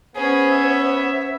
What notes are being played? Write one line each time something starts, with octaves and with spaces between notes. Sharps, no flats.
B3 C#4 G#4 C5 C#5
E5